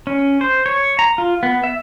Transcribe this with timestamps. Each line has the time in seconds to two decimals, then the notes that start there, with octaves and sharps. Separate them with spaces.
0.07 C#4
0.41 C5
0.66 C#5
0.99 A#5
1.18 F4
1.43 B3
1.64 E5